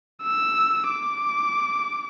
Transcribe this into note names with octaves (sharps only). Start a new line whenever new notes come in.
E6
D6